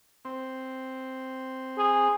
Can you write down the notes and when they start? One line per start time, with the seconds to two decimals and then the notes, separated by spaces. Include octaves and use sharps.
0.25 C4
1.78 G#4